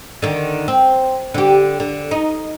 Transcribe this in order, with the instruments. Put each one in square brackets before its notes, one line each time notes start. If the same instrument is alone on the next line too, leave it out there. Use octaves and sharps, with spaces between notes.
[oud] D3 D#3
C4
D3 G4
D3
D#4